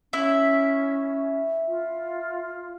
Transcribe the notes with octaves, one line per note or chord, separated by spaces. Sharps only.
C#4 E4 E5
F4